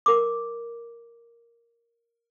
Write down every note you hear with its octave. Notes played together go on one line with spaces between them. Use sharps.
A#4 D6